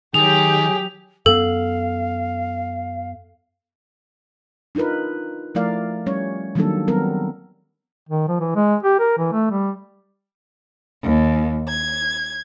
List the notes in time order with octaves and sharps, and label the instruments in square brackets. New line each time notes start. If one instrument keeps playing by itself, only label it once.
[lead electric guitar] D#3 [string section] F#3 G4 [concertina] G#4 [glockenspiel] F7
[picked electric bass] F#2 B3 [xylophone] A4 [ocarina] F5
[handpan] D4 D#4 F4 A#4 B4
F3 A3 E4 A#4 D5 F5
G3 C#4 C#5
D#3 F#3 G3 A#3 D4 A4
F#3 G3 B3 C4 A4 A#4
[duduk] D#3
F3
E3
G#3
G4
A#4
E3
A3
G3
[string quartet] D#2
G#6